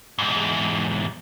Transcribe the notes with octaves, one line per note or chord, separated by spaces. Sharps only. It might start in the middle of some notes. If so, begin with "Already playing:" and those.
E2 G#2